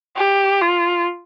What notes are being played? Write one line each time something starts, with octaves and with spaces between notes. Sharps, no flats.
G4
F4